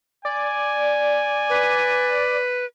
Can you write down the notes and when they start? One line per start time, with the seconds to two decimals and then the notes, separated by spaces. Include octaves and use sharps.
0.25 D5 G#5
1.50 B4